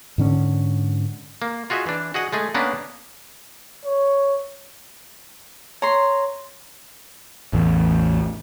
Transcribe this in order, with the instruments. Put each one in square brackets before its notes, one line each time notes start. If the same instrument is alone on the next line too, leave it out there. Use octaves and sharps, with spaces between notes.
[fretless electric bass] G#2 D3 C#4
[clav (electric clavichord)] A#3
F4 F#4 G#4 D#5 E5
E3 D4
F#4 G#4 D#5 F#5
G#3 A3 G#4
A#3 B3 C#4 D4 A#4 B4
[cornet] C#5
[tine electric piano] C#5 [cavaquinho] A#5 C6
[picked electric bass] A1 E2